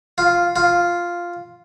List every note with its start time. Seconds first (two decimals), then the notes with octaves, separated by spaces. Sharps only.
0.18 F4
0.56 F4